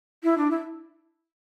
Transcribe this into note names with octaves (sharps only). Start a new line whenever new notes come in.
E4
D4
E4